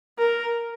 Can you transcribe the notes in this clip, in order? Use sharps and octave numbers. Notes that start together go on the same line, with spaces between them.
A#4